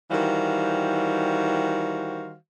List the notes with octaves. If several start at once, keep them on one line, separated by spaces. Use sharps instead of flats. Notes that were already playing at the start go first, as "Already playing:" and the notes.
D#3 E3 G3 F#4 C5 F5